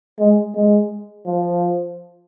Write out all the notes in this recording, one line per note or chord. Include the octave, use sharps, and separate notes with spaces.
G#3
G#3
F3